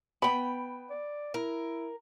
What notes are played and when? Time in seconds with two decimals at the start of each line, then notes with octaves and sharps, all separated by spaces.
0.22 B3 G5 B5
0.90 D5
1.34 E4 A#4